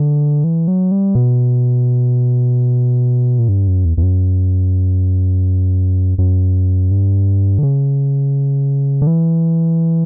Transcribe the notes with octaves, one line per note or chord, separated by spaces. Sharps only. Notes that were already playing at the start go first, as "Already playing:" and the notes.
Already playing: D3
E3
F#3
G3
B2
A#2
G2
F#2
E2
E2
F#2
F#2
G2
D3
C#3
D3
E3